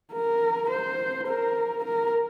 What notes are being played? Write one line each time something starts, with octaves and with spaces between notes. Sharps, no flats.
A#4
C5
A#4
A#4